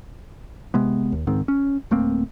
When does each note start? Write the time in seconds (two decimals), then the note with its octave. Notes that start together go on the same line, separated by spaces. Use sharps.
0.74 C3 G#3 B3
1.12 D#2
1.27 C#2 G#2 D#3 C4
1.48 C#4
1.91 D1 A3 A#3 C4